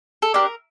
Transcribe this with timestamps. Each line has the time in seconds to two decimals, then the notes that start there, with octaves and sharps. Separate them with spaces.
0.22 A4
0.34 D4 G4 A#4